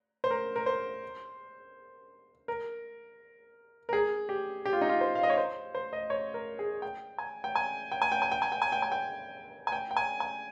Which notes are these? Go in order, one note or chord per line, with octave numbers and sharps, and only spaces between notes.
C5
A#4
A#4
C5
A#4
A#4
G#4
G4
G4
F4
D#4
F4
C5
F5
D#5
C#5
C5
C5
D#5
C#5
A#4
G#4
G5
G#5
G5
G#5
G5
G#5
G5
G#5
G5
G#5
G5
G#5
G5
G#5
G5
G#5
G5
G5
G#5
G#5